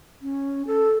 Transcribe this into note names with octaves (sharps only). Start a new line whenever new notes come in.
C#4
A4